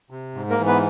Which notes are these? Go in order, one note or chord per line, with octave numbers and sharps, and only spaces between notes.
C3
G#2
A#3 A#4
E3
B3 B4